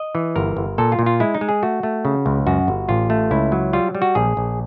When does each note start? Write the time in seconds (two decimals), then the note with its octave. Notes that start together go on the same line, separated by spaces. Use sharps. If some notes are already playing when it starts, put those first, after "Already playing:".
Already playing: D#5
0.15 E3
0.36 G1 A#4
0.57 G1
0.78 A#2 A4
0.92 F4
0.99 A#2
1.06 F4
1.20 G#3 E4
1.34 D#4
1.41 G#3
1.49 G#4
1.63 A3 F#4
1.83 A3
2.05 C#3
2.26 C#2
2.47 F#2 F#4
2.68 G1
2.89 A1 F4
3.10 A3
3.31 C#2 E4
3.52 F#3
3.73 G3 F4
3.95 G3
4.02 F#4
4.15 A#1 G#4
4.37 A#1